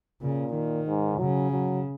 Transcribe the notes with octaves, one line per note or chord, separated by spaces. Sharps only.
A#2 C#3
D#3
G#2
C#3 F#3
F#3